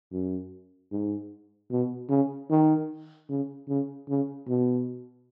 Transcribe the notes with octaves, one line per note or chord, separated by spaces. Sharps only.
F#2
G#2
B2
C#3
D#3
C#3
C#3
C#3
B2